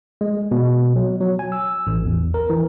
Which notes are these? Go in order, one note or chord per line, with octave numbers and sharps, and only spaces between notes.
G#3
B2
F#3
F#3
G#5
E6
A1
E2
A#4
E3